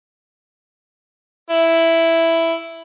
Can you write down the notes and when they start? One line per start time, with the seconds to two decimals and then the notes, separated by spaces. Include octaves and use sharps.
1.50 E4